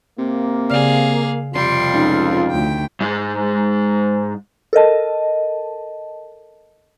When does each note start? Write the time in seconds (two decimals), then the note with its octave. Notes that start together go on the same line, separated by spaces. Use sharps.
0.19 C3 A#3
0.70 C#3 G#4 D5 F5 F6
1.53 F2 C3 G3 F4 C6
1.94 C#2 D#4
2.50 D2 G5
3.01 G#2 G#3
4.73 A4 A#4 D#5 A5